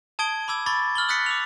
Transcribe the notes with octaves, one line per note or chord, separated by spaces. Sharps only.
A5 D#6 G#6 D7 G7
B5 D6 E6 G#6
B5 C#6 D6 A6
E6 F6 F#7 G7
D#6 F#6 A6 B6 C#7
D6 E6 F7